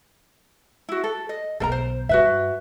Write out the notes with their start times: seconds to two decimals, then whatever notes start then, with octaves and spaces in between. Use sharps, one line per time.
0.89 E4 F#4
1.04 A4
1.29 D#5
1.60 B1 D3 A4 A#4 A#5
1.72 C5
2.09 G2 F#4 B4 E5